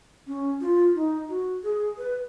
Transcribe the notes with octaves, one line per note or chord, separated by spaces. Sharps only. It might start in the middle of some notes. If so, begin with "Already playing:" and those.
C#4
F4
D#4
F#4
G#4
B4